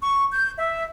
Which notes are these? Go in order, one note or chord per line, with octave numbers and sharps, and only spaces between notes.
C#6
G6
E5